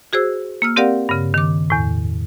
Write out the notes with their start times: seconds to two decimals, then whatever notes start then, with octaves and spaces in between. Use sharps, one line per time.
0.13 F#4 G#4 C5 E6
0.62 A#3 E6 F6
0.76 C4 G4 A#4 D5 F5 F#5
1.09 G2 C#3
1.34 D#3 D6
1.70 E2 A2